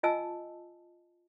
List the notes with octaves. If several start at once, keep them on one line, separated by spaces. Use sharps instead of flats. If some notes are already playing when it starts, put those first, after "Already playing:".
F4 D#5 G#5 A5 E6